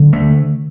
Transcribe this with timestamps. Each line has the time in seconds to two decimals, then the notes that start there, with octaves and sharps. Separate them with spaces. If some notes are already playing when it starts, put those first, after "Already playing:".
Already playing: D3
0.13 A3